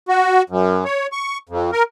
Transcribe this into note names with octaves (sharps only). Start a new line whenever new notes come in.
F#4
F#2
C#5
C#6
F2
A#4